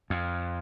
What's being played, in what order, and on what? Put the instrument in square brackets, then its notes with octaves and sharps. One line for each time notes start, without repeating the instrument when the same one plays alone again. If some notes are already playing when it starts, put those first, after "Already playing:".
[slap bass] F2